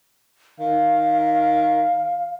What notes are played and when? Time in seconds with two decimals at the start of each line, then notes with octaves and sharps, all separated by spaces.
0.59 D#3 F5